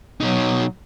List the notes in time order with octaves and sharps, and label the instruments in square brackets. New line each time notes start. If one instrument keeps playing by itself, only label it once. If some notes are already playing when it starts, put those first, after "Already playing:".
[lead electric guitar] B2 D#4 [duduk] F#3